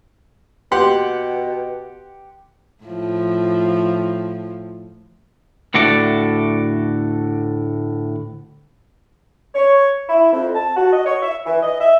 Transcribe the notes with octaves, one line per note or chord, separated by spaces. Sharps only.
B2 G4 F#5 C6
A2 F3
D2 A2 F#4 A4 D5
C#5
E4
F2
A5
F#4
D#5
C#5
E5
E3
D#5
E5